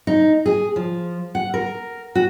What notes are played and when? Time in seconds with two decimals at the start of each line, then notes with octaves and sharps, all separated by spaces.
0.07 D#4
0.46 G#4
0.76 F3
1.35 F#5
1.54 A#4
2.15 F#4